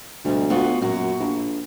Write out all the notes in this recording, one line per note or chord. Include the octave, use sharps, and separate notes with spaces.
D2 B2 G3
B3 F4 F#4
F#2 A#2 F#4
A#1